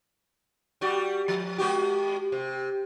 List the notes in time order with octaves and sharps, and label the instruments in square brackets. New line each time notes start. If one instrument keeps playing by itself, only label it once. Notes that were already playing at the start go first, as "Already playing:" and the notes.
[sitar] G3 F#4 D5
F3
G#3 F#4 G4
C3